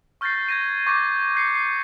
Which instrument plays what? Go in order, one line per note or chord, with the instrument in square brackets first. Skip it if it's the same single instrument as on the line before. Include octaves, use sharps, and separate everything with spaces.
[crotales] C#6 F6 G6 A6 A#6 C7
G#6 A#6 D#7
C#6 D6 G6 A#6 C7 D#7
G6 C7 C#7
C7